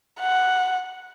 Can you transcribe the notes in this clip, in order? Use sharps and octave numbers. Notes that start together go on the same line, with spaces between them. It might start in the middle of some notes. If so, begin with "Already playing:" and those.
F#5